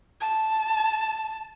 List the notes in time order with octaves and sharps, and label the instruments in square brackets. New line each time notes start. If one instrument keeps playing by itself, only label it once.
[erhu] A5